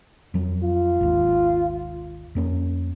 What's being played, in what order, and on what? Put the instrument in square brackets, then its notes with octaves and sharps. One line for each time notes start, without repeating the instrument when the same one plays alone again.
[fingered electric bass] F2 F#3
[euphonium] F4
[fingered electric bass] G#1 D#2
F2 A#3 C#4